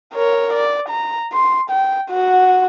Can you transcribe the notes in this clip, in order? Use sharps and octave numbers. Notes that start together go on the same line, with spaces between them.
A#4 C#5
D5
A#5
C6
G5
F#4 F#5